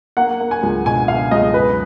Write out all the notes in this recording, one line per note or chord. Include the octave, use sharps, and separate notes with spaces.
A#3 F#5
A#3
G#5
C#2
B2 G#5
B2 F5
C#2 D#5
F#2 B4